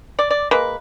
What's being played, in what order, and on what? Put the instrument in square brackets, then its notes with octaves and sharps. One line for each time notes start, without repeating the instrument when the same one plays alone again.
[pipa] D5
D5
G#3 A#3 B4